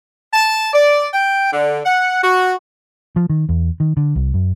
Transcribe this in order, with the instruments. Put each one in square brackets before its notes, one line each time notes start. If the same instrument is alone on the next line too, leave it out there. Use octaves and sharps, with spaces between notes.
[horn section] A5
D5
G5
D3
F#5
F#4
[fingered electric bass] F3
D#3
E2
D#3
D3
C2
F#2